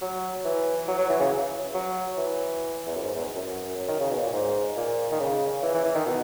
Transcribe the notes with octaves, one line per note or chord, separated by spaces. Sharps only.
F#3
E3
F#3
F#3
E3
C#3
F#3
E3
E2
F#2
G#2
E2
F#2
D#3
C#3
B2
A#2
G#2
A#2
D#3
C#3
E3
E3
E3
D#3
B2